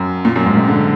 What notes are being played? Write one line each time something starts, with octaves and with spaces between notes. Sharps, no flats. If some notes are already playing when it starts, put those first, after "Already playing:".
Already playing: F#2
A#2
F#2
G#2
G#2
D3